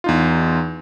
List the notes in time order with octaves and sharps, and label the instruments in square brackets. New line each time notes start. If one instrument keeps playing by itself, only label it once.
[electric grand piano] E2 D#4 F4